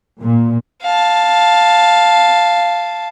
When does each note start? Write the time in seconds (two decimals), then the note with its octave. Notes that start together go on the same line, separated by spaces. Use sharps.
0.22 A#2
0.82 F5 A5